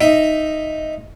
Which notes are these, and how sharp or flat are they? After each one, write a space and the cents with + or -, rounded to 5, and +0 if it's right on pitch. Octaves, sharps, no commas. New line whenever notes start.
D#4 +0 E5 +0